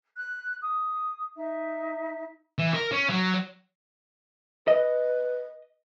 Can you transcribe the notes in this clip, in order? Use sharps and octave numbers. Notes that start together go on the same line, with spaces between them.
F#6
D#6
D#4 E5
E3
A#4
C#4
F#3
B4 D#5